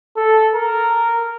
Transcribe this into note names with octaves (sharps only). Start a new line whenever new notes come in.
A4
A#4